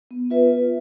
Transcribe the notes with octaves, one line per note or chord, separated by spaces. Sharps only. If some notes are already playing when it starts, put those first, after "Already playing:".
B3
F4 B4 E5
F4